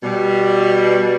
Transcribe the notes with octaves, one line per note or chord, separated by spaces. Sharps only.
B2 G3